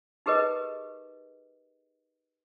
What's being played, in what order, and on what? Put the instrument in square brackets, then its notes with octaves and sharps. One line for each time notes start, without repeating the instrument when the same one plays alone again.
[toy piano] D#4 G4 G#4 A#4 B4 D#5